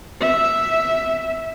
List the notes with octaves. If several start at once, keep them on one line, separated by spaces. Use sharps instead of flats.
E5